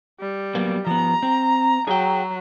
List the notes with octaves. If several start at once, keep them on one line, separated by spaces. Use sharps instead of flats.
G3
F#3 A#3 B3
F3 B3 A#5
C4
F#3 G#4 G5